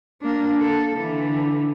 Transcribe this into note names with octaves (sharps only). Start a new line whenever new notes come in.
A#3 D4
A4
D3 E3